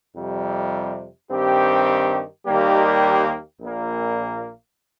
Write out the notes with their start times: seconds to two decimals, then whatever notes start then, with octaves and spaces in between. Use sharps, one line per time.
0.16 F2 C3 G3
1.30 G2 D#3 C4 G4
2.45 D#2 D#3 G3 A#3 G4
3.60 A#1 A#2 A#3